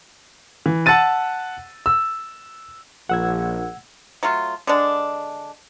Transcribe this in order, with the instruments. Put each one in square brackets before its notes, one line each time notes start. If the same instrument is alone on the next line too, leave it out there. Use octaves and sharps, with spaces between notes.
[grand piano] E3
F#5 A5 E6 A6 D#7
E6
[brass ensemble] A#1 [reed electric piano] F#5 E6 G#6
[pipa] F#3 A3 F4
D3 G#3 D4